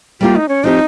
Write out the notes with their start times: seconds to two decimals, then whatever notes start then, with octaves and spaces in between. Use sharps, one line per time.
0.21 G3 A#3 F4 G4
0.35 D#4
0.49 C#4
0.64 F3 C4 D#4 G4